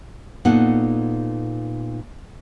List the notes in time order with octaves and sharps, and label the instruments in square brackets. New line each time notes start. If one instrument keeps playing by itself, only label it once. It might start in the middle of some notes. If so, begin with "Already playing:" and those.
[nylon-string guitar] A#2 B3 D#4 A4 F#5